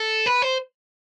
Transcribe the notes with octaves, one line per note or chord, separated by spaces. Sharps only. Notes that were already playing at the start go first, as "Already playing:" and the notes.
Already playing: A4
B4
C5